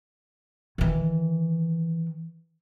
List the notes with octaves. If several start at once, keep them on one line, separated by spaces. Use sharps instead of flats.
D#3 E3